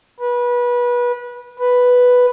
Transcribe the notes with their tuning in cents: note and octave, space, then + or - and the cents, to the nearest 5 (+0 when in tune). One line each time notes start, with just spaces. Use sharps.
B4 -25
B4 +0